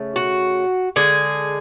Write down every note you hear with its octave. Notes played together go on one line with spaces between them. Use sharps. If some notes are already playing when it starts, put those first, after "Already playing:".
Already playing: C#3 A3
F#4
D3 G#3 G#4